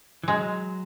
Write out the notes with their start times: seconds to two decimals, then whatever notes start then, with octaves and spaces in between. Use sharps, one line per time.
0.23 E3
0.28 F#3 G#3